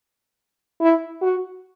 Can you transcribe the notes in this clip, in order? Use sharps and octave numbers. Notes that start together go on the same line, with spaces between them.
E4
F#4